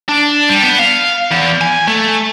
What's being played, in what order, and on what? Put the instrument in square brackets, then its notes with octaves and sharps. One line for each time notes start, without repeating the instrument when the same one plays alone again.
[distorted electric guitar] D4
G3
B3
F5
E2
G#5
A3